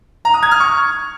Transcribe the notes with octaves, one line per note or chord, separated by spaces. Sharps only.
A#5
D#6
G#6
F6
C#6